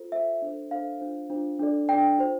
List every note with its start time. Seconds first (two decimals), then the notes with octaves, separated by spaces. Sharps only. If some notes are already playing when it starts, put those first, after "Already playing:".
Already playing: F4 A4 C5
0.12 F4 A4 C5 E5
0.42 D4 A4 C5
0.71 D4 A4 C5 F5
1.01 D4 F4 C5
1.30 D4 F4 C5
1.59 D4 A4 D5
1.89 D4 A4 D5 G5
2.18 F4 C5